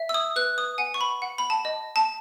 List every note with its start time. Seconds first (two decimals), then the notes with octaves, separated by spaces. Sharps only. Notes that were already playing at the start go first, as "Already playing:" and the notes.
Already playing: E5
0.09 E6
0.14 D#6
0.36 B4 F#6
0.58 D#6
0.78 F#5 G#5
0.94 C#6
1.01 B5
1.22 F#5
1.38 B5
1.50 A5
1.65 D#5
1.96 A5